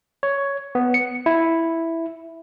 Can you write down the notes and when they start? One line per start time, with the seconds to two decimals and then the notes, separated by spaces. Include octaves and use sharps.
0.23 C#5
0.75 B3
0.94 C#7
1.26 E4